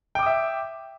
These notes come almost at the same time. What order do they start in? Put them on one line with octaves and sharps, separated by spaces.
G5 D6 D#6 E5